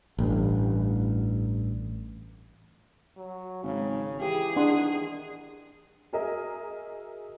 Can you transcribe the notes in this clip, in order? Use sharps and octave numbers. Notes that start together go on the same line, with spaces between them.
A1 G2
F#3
G#1 C#3
E3 G4 G#4
D#3 D4 F#5 C6
F#4 G#4 A#4 D#5 E5